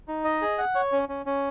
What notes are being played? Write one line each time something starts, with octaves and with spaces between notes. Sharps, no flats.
D#4
D#5
G#4
F#5
C#5
C#4
C#4
C#4